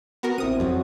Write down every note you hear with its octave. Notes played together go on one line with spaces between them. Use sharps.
B3 F#4 A#4
A1 C4 E4 D#6 D#7
F2 F#3 F#4